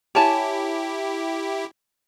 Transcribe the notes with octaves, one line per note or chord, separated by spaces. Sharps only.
E4 G4 C#5 G#5 A5